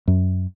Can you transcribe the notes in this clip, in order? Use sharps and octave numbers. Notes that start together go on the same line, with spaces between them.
F#2